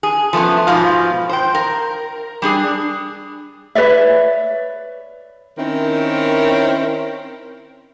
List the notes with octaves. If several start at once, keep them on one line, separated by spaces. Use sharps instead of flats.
G#4
F3 A3 B3 C#4
G#2 B2 F3 F4
C5 G5
A#4
G3 D4 G#4
B4 C#5 D5 E5
D#3 C4 C#4 E4 A#4 C5